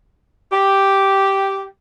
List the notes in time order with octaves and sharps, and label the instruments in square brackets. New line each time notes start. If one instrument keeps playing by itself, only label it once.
[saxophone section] G4